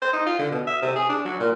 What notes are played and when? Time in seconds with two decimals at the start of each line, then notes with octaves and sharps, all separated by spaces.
0.02 C5
0.13 D#4
0.26 F4
0.39 D3
0.51 B2
0.67 E5
0.82 C3
0.96 G#4
1.09 D4
1.25 F#3
1.40 A#2